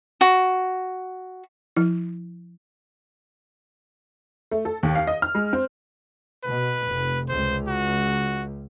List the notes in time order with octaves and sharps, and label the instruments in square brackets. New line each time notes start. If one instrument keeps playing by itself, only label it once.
[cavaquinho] F#4
[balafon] F3 E4
[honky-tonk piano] A3
A4
D#2
F5
D#5
F6
G#3
C4
[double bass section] B2 [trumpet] B4
[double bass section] F1
[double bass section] C#2 [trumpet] C5
[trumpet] F#4